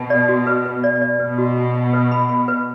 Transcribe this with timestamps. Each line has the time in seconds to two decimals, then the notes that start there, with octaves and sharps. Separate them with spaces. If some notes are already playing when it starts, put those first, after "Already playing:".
Already playing: B2 A5
0.10 D5
0.29 F#4
0.47 B4
0.65 B4
0.84 D5
1.02 D5
1.20 B2 B4
1.38 F#4
1.57 A5
1.75 A5
1.93 B4
2.12 B5
2.29 B5
2.48 B4